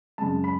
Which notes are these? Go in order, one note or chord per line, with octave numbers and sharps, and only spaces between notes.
F#2 C#3 G#3 A5
B5